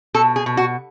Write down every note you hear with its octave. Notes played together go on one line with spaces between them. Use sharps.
B2 A4
G#4
B2
F#4